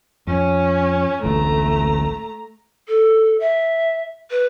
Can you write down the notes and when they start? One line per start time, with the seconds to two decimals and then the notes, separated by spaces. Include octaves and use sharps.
0.27 F2 C#4
1.23 D1 A1 D2 A3 A#5
2.88 A4
3.40 E5
4.30 B4